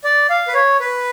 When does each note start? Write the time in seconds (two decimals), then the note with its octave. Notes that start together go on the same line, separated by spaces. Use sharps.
0.04 D5
0.30 F5
0.48 B4
0.54 C#5
0.80 B4